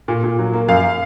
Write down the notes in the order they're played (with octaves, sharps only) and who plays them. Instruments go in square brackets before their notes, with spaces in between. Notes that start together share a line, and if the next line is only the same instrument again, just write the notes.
[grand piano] A#2
A#2
F#3
A#3
F#2 F5